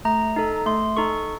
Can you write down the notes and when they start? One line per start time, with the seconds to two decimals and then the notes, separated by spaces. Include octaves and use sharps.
0.05 A3 A#5
0.36 D#4 A4
0.66 A3 C6
0.97 D#4 A4 C#6